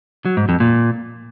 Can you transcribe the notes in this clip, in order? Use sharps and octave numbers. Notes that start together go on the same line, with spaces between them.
F#3
G#2
F2
A#2